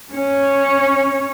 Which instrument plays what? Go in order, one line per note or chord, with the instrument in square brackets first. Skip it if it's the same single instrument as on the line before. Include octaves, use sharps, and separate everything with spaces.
[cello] C#4 C#5